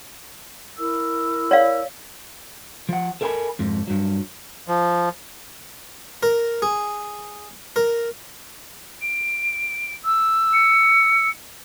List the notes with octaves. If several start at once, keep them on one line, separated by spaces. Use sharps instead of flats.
E4 A#4 E6
C#5 D5 F5
F3 F#5
A4 A#4 D#5 G5 G#5 B5
F2 G#2
G2 F#3
F3
A#4
G#4
A#4
D7
E6
C#7